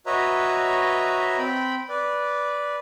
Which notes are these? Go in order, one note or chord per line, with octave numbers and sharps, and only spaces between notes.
F#4 B4 C#5 D#5 E5 A#5
C4 G5 B5
B4 D5